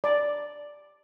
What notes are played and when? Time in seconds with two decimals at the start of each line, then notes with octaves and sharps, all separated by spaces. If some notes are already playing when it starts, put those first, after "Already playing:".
0.04 D5